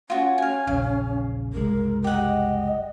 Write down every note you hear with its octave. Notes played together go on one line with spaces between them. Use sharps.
C#4 F4 F#4
F5 G#5
A#1 E2 C#3 F5
F#1 C2 G#3 A#4
G4 D#5 F#5